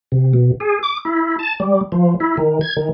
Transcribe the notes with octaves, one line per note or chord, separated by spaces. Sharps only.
C3
B2
G#4
D6
E4
A5
G3
F3
E4
D#3
G#6
D#3